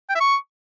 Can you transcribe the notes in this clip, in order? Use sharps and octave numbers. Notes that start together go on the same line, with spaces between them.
G5
E5
C#6